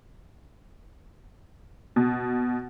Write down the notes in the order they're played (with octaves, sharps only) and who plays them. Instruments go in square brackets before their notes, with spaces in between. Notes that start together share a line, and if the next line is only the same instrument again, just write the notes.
[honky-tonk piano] B2